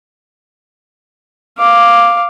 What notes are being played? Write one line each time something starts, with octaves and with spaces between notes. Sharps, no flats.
F5 D6